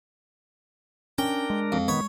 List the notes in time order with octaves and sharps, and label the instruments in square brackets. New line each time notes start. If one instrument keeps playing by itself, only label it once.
[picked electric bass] C#4 [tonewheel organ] D4 A#4 [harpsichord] G5
[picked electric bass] G#3
[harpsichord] F2
[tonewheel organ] D#3 B3 [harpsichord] C#5